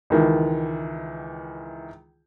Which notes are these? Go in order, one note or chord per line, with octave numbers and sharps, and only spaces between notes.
C#2 D#3 E3